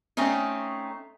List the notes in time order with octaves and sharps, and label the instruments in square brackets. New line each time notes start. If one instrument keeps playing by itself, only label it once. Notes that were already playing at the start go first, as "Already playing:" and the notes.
[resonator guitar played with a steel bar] A3 C4 C#4 D#4